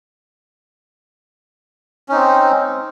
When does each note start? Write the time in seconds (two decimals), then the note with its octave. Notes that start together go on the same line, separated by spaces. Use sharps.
2.09 C#4
2.12 D#4
2.15 C4